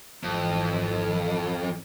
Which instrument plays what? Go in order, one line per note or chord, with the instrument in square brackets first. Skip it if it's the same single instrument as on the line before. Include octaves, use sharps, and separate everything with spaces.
[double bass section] G#1 E3 [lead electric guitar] F2